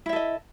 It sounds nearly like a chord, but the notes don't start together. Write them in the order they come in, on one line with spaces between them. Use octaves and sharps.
E4 E5 A4 D#5